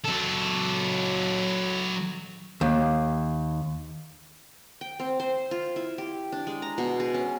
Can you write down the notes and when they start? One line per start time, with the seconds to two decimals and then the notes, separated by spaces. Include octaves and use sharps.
0.04 F#3 A4
2.61 D#2
4.81 G5
5.00 C4
5.20 C5
5.51 F4
5.76 E4
5.98 G4
6.32 D4
6.47 G#3
6.62 A#5
6.78 B2
7.00 G#4
7.14 C#4